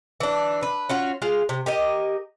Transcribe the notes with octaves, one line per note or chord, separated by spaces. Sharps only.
E3 D4
B4
C#4 F4 F#4
G#3 F4 F5
C3
G4 A#4 D#5